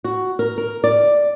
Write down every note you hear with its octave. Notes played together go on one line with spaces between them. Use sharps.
F#4
A#4
A#4
D5